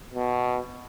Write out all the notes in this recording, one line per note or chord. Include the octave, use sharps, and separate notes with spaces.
B2